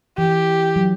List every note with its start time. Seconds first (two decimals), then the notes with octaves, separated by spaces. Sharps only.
0.18 E3 G4
0.76 F#3